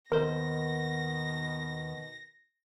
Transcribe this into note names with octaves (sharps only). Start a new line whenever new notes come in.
D#2 B2 D#3 B3 A#4 C5 A#6